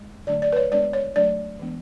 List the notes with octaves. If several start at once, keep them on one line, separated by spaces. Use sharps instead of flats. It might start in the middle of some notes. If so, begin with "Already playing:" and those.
Already playing: G#3
D3 F#3 A3 D4 D5
D5
B4
C#5
G#3 B3 D4 D5
C#5
F#3 A3 D4 D5
E3 G#3 B3 D4